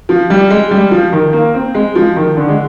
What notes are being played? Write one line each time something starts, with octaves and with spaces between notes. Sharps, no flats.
F3
G3
G#3
G3
F3
D#3
A#3
C4
G#3
F3
D#3
D3
G#3